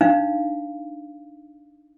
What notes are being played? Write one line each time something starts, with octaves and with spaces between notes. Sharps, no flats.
D4 D#4 F5